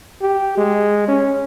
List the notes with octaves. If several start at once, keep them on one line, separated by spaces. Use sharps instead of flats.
G4
G#3
C#4